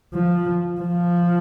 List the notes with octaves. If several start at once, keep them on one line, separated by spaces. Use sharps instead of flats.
F3
F3